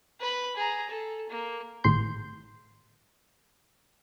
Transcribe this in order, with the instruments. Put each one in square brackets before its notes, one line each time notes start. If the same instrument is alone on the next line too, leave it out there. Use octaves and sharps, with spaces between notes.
[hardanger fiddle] B4 B5
G#4 A#5
A4
A#3
[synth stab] G#1 A2 C6 G6